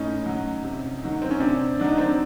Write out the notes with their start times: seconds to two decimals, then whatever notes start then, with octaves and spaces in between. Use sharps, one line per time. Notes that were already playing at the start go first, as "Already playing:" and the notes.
Already playing: A2 C#4 D#4
0.26 F#3
0.64 C3
1.03 D#3 F#3
1.22 C4
1.31 C#4
1.40 C3 C4 D4
1.79 D#3 F#3 D4
1.89 D#4
1.98 C4 D4